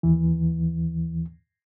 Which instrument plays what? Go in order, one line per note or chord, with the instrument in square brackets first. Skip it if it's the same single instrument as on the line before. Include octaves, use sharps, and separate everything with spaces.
[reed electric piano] D#2 E3